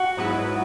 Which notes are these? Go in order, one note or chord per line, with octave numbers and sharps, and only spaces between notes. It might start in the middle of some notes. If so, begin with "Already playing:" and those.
Already playing: F#4
G#2 F#3 B3 E4 B4